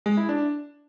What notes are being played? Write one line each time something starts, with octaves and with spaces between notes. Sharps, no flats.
G#3
E4
D4